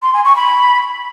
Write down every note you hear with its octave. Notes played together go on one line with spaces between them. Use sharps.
C6
G#5
C#6
B5